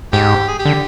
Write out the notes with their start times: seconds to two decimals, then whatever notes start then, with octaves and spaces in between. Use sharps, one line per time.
0.12 G#2 G4
0.48 G#4
0.59 G4
0.65 D3